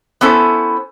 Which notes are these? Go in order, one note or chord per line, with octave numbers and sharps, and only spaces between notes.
B3 C#4 E4 A4 C5